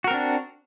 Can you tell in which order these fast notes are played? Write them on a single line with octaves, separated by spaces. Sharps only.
F#4 A#4 C4 D4